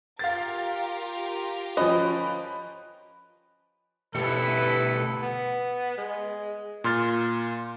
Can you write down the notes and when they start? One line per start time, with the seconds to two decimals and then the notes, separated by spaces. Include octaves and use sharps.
0.19 F4 G4 A#4 F5 A6
1.77 F3 C#4 B4 D#5
4.15 B2 A3 E4 G4 A4 B4 C#7
5.23 B3
5.98 G#3
6.84 A#2 C6 F6 A6